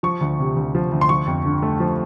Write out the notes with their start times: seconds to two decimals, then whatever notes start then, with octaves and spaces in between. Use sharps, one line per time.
0.03 F3 C#6
0.21 D2
0.39 C3
0.57 D2
0.75 F3
0.92 D2
1.01 C6
1.09 F3 C#6
1.27 F2
1.45 D3
1.62 A3
1.80 F3